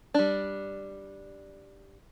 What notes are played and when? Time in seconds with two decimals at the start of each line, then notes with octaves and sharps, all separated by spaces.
0.14 G3 D4